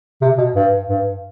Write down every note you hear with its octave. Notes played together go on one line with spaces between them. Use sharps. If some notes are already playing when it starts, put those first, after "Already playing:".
C3
B2
G2
G2